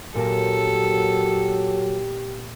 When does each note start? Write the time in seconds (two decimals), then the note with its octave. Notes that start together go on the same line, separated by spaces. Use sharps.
0.15 A#2 F#3 G4 A4 A#4 A5